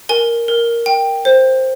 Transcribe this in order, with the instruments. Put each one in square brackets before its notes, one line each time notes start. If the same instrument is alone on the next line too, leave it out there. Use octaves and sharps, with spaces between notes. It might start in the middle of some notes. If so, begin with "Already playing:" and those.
[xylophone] A#4 G#5
A#4
G5
C5